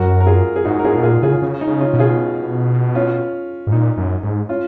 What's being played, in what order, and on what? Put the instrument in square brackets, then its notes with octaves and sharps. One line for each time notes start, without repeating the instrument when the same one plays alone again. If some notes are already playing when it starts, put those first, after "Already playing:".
Already playing: [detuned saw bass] F#2 [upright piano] F#4 A#4
[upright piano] A#4
F4 G#4
G#4
[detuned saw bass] G#2 [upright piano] D#4 F#4
[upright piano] A#4
[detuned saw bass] G#2 [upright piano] F4 G#4
[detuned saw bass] B2
[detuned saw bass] A#2 [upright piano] F4 G#4
[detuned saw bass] C#3 [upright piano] F4 G#4
[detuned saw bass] C#3
[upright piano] D#4
[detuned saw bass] C#3
[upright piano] C#4 F4
[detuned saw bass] B2
[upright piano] F4 G#4
C#4 F4
[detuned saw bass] G#2
[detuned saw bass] A#2 [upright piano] D#4
[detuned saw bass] F#2
G#2
[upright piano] C#4 F4